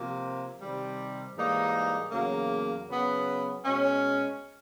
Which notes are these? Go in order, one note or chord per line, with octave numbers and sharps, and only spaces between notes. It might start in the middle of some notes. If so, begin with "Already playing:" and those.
Already playing: C3 F3 A#3
C3 D#3 G3
G#2 E3 G3 A#3 D#4
E2 C#3 F#3 A#3
C#3 F#3 B3
B2 G#3 C#4